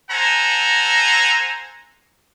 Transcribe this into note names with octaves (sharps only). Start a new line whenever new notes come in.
A4 C5 F#5 G#5 A#5